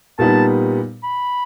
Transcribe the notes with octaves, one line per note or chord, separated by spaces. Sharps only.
A#2 G3 B3 D#4 A5
B5